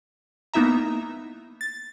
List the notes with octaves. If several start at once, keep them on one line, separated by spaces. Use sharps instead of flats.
A#3 B3 D#4 E4 E5 A#5
A6